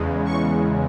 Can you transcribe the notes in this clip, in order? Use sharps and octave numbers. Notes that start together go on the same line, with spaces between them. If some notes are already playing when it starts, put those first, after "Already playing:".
Already playing: E2 C#3 G#3
C#6